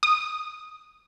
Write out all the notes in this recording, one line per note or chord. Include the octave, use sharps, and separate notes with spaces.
D#6